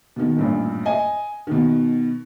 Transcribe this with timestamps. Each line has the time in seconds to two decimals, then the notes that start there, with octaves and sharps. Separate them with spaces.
0.16 B2 D#3
0.37 A1 G2 A#2
0.86 D#5 G#5
1.47 B2 D#3